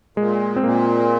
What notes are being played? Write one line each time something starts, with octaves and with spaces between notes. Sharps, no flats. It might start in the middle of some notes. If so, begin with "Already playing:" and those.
A#2 G#3
C4
A#2 A#3